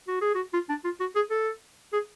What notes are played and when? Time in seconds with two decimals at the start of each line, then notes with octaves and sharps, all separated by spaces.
0.08 F#4
0.21 G#4
0.35 F#4
0.53 F4
0.69 D4
0.85 F4
1.00 F#4
1.16 G#4
1.31 A4
1.93 G#4